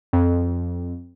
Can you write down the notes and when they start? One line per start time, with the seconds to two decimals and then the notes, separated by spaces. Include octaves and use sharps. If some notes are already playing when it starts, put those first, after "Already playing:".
0.13 F2